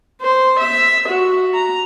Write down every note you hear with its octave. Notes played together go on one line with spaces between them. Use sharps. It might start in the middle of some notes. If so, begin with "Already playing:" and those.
C5
E5
F#4
A#5